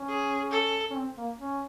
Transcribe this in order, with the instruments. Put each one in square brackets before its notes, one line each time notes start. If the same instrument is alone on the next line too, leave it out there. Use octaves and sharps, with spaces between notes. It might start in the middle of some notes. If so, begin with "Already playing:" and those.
Already playing: [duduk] C#4
[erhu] G#4
A4
[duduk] C#4
C4
A#3
C#4